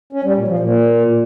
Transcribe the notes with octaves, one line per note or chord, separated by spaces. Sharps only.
C#4
G3
A#2
F3
A#2